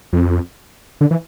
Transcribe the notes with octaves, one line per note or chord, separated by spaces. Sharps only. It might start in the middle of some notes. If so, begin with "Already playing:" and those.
F2
D3
E3